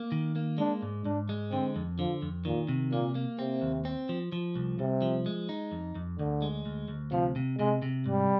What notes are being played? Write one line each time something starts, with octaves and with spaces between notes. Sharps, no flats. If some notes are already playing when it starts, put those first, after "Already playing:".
Already playing: A#3
D#3
A#3
G#3 D4
G#2
G#2 D4
G#3
D3 C4
F2
D3 F3
F2
A#2 D#3
C3
A#2 A#3
A#3
C3 C4
D#2
C4
F3
F3
C2
C2 C3
F3
G#3
D#4
F2
F2
D2 D3
G#3
D2
D2
C3 F3
C3
C3 G#3
C3
G#2 G3